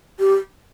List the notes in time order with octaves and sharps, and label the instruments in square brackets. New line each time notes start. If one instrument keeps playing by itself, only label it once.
[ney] G4